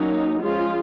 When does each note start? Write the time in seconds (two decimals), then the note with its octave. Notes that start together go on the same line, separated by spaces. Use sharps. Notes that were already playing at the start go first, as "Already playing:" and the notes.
Already playing: F#3 A#3 C#4 D#4
0.42 F3 G#3 C#4 F4